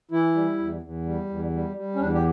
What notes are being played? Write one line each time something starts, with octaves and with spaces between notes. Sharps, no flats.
E3 E4
G3
E2
E2
G3
E2
G3
G3
C#4
E2 D4
G4